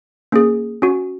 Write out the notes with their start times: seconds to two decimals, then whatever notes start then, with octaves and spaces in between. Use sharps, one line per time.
0.32 A#3 C#4 G#4
0.82 C#4 F#4